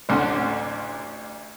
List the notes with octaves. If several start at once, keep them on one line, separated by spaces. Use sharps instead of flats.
A1 D2 D3 C#4 F#5 C6